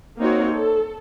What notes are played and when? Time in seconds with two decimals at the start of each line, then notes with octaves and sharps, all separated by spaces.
0.18 A#3 C4 D#4 F#4 C#5
0.53 A4